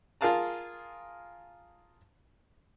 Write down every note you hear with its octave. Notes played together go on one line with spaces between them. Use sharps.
F4 G#4 A#4 F5 A5 A#5